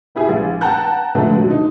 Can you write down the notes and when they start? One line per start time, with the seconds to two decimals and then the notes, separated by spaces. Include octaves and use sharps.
0.15 B3 E4 G4 G#4
0.29 A#1
0.61 F#5 G5 A5 A#5 F#6 G6
1.15 A#2 D3 F3 G#3 A3
1.36 D3 F#3 G#3
1.50 D#4